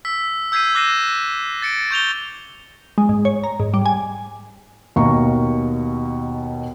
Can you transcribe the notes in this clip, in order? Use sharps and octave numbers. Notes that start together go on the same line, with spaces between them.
E6 B6
E6 G6 G#6 B6 C7 D#7
D6 F#6 A#6 C7 D#7 E7
A6 C#7 D7
C#6 G6 F7 G7
G#3
G#2
C#5
A#5
G#2
G3
G#5
D#2 B2 F5 A#5 C#6